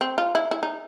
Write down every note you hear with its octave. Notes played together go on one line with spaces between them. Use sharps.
C4
F4
E4
E4
D#4